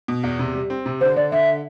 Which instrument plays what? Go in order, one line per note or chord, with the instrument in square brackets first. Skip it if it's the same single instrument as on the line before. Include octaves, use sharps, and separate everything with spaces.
[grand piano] B2
E2
C3
G3
C4
C3
[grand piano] D3 [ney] C5
[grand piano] D3 [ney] D5
[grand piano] D3 [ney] E5